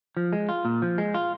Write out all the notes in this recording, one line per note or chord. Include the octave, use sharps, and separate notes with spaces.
F3
G#3
F4
A#2
F3
G#3
F4